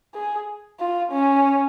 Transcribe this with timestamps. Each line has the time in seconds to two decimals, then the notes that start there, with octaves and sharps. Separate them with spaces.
0.14 G#4
0.79 F4
1.12 C#4